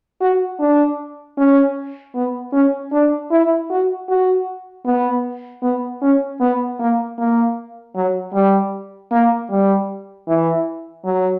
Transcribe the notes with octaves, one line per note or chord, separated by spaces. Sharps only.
F#4
D4
C#4
B3
C#4
D4
E4
F#4
F#4
B3
B3
C#4
B3
A#3
A#3
F#3
G3
A#3
G3
E3
F#3